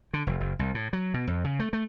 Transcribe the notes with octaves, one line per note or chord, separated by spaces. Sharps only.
D3
F1
F#1
C2
A2
F#3
B2
F2
C#3
A3
A3